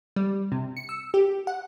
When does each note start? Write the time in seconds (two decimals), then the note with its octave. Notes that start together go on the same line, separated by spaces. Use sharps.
0.16 G3
0.52 C3
0.77 C#7
0.89 E6
1.14 G4
1.47 F#5